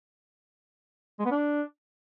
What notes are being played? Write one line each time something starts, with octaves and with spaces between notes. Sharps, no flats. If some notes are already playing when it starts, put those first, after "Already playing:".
G#3
B3
D4